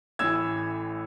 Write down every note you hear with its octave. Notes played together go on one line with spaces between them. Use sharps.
A1 A2 E3 E6 G#6